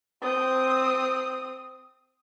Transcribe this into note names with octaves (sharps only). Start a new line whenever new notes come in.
C4 D#6